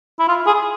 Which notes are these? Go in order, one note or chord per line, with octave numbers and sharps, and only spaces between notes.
E4
F4
G#4